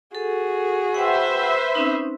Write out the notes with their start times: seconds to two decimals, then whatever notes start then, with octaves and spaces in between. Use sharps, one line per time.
0.15 F#4 G#4 A4
0.95 B4 C5 E5 F#5 G5
1.75 C4 C#4 D#4